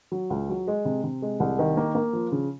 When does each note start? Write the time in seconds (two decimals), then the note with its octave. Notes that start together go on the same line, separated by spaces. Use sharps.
0.12 F#3
0.30 C#2
0.49 F#3
0.67 G#3
0.85 C3
1.04 C3
1.22 G#3
1.40 C2
1.59 D#3
1.77 A#3
1.95 A#3
2.13 F3
2.32 C#3